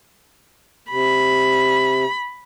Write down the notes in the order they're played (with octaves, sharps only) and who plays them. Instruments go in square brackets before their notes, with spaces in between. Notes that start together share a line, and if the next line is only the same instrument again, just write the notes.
[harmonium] C3 [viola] B5